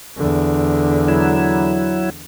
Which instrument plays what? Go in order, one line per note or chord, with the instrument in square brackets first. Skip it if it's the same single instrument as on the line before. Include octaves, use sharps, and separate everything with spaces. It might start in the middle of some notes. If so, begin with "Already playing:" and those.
[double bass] E2 D3
[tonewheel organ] F#3 E4